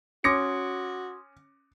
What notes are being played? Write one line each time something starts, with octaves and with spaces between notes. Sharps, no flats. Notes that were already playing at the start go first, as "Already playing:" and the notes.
C#4 F#4 C6 D6 D#6 G#6 A#6 C#7